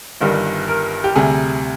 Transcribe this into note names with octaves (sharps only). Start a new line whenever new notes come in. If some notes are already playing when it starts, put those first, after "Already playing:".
G1 G2 D#3 G3
A#4
G4
D2 C3 G3 G#4